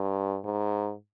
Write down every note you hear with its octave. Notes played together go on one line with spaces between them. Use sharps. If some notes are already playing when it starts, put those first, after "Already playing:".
Already playing: G2
G#2